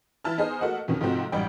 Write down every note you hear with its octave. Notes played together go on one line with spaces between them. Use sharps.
E3 E4 A5 F6
B3 D#4 G#4 C5
A3 A#3 F#4 A4 D#5 F#5
F2 B2 D#3 C#4
G#2 C3 F3 A3 C4 F#4
A1 F#2 G3 D#4 D5 G5